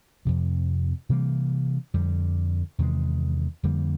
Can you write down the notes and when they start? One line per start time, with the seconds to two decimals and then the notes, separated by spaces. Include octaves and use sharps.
0.25 F2 C3 F3
1.09 C3 E3 G3 A#3
1.94 F2 D3 G3
2.78 E2 C3 D#3 G#3
3.63 F2 D3 G3 A#3